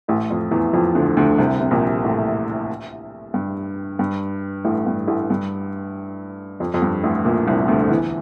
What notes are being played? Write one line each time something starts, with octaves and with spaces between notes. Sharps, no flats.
A1 A2
F2
E2 E3
F2 F3
D2 D3
D2 D3
C2 C3
C3
A#1 A#2
A1 A2
G2
G2
A1 A2
G2
A1 A2
G2
F2
F2
G2
A1 A2
A#1 A#2
C2 C3
D2 D3
E2 E3